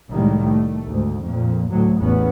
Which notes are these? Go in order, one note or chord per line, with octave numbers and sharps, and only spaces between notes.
C2 A2 D#3 G3 G#3 A#3
A3
D2 G#2
F2 A#2
D2 A2 F#3
A1 E2 B3 C#4